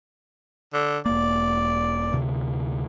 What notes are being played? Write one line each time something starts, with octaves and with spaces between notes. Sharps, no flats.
D3
E1 A#3 D5
D2 C3